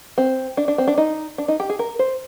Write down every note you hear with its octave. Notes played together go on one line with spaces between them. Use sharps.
C4
D4
D4
C4
D4
D#4
D4
D#4
G4
G#4
A#4
C5